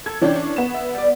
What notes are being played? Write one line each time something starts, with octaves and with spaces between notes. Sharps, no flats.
A4 G#6
C3 E3 C#4 D4 G5
C#5
B3 E7
E5
G3 D5